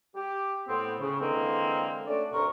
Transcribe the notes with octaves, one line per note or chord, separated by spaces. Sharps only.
G4
A2 B3 C4
C#3
D3 E3 G#3 A#3 C4
A3 C#4 D4 F#4 D5
D2 G2 C3 A#4 C#6